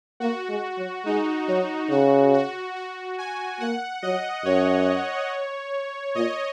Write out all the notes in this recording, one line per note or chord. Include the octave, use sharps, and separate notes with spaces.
A#3 F#4
G#3
F#3
G#3 D#4
F#3 F#4
C#3 F#4
F#4
F#4
G#5
A#3 F#5
F#3 D#5
F#2 C#5
A#2 D#5